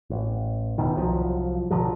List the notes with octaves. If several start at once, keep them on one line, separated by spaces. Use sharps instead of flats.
A1
E1 B2 D#3
C2 F3 F#3
B2 D3 F3 F#3